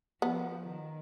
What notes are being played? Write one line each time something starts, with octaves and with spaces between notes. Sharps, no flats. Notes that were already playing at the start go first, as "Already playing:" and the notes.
F3 B3
D#3